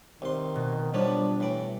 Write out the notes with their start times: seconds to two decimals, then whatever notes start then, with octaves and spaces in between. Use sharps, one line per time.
0.22 C2 D#3 C6
0.56 B2
0.94 F3 G3 B3 D4 C#5
1.40 A2 E3 D5